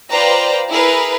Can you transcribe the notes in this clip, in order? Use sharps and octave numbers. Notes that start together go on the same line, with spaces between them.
F4 B4 C5 D5 G5 A#5
E4 G#4 A#4 B4